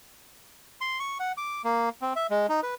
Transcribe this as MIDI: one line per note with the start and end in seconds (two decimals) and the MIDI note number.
0.81 0.99 84
1.00 1.18 85
1.20 1.32 78
1.37 1.62 86
1.64 1.89 58
2.01 2.13 60
2.16 2.27 76
2.30 2.47 56
2.49 2.61 63
2.63 2.75 71